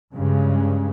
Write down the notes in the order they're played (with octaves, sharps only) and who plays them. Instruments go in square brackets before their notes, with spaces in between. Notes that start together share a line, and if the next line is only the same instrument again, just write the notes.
[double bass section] G2 C#3 G#3